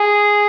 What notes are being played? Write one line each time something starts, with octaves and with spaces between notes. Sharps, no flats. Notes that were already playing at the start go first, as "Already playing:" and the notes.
Already playing: G#4